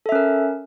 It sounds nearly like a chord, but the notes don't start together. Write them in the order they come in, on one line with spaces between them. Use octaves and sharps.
A4 E5 C#4 A#4